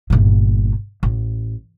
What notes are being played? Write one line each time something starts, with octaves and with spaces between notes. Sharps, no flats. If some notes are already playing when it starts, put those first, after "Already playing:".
G1 A#2
A1